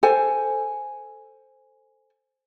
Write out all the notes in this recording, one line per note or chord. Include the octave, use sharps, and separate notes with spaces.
A4 C5 G#5